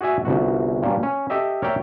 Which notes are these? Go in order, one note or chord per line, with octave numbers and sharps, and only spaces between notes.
F#4 G#4 D5 E5 G#5
G1 C2 F#4
G2 A#2 A#3 C#4
C#4
G4 A4 D#5 E5
A#4 C#5 D5 E5 G5